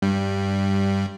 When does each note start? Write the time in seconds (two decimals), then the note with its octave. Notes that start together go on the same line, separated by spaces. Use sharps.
0.02 G2 G3